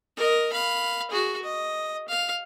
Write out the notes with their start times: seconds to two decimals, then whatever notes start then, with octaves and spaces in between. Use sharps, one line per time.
0.17 A#4 D#5
0.53 F5 B5
1.11 F#4 G#4
1.43 D#5
2.08 F5